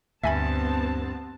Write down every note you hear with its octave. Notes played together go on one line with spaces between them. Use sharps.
D2 G2 B3 C4 E5 G#5 A5 B5